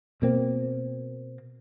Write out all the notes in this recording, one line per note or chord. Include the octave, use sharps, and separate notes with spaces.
B2 A#3 C4